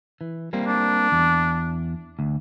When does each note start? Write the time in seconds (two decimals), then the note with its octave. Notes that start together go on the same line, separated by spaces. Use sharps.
0.21 E3
0.53 G3 A#3 C4
0.68 D4
1.12 E2
2.19 D2